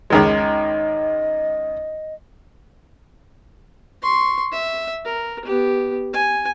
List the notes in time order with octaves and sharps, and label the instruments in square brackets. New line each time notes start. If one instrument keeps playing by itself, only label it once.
[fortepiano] C#2 D#3 G#3
[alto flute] D#5
[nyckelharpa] C6 C#6
E5
A#4
B3 G4
G#5